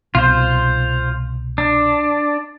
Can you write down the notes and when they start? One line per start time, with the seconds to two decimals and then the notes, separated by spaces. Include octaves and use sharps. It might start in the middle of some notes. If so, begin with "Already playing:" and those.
0.15 C2 B2 F4 C5
1.58 D4